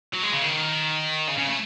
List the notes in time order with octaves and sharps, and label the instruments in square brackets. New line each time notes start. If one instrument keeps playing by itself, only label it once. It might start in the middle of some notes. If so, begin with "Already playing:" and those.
[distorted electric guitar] F#3
G#3
C#3
D#3
C#3
C#3
A3